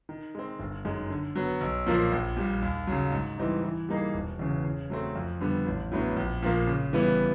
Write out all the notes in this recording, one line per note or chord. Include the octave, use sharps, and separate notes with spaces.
D#3
G#3 C4
G1
F#2 D#3 G#3
D3
F#3 B3
B1
A#2 F3 A#3
A#1
A#2 G3
D#2
C#3 F#3
G#2
E3 G3 C4 D#4
E3
G3 A#3 D#4 G#4
E1
E2 C#3
C#3
F#3 A3 C4
F2
D3 G3 B3
A1
A2 F#3 B3 D4
A#1
A#2 F3 A#3
C#3
E3 G3 B3 E4